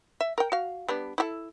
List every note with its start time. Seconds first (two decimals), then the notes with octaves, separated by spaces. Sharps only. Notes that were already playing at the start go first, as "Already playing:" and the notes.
0.21 E5
0.38 A#4 G5
0.52 F#4 F5
0.89 G3 B3 D4
1.18 E4 G4 A4